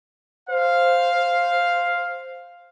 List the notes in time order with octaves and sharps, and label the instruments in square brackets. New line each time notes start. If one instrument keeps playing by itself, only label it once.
[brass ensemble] C5 F5